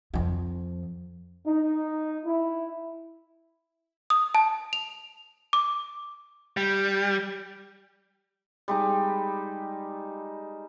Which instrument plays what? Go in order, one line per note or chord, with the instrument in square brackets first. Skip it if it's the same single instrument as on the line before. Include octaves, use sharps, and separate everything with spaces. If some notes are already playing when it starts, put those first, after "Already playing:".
[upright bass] F2 F3
[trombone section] D#4
E4
[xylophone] D#6
A5
F7
D6
[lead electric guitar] G3
[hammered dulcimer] G3 G#3 D#4